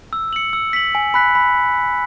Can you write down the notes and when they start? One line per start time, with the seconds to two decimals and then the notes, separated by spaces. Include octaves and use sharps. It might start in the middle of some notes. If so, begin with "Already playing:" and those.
0.13 E6
0.33 C#7 F#7
0.53 E6
0.73 B6 F#7
0.95 G#5
1.14 B5 F#6 B6
1.35 B5